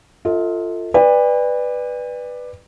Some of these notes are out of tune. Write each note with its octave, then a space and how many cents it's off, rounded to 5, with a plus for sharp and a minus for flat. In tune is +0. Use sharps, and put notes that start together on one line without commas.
F4 +0 A4 +25 D#5 +45
B4 +0 D5 +15 G5 +45